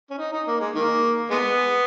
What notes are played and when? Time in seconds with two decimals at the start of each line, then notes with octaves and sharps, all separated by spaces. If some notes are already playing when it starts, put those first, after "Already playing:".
0.10 C#4
0.18 D#4
0.32 D#4
0.47 A#3
0.60 G#3
0.75 D#3 A#3
1.30 G#3 B3